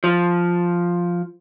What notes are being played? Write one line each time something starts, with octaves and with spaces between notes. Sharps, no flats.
F3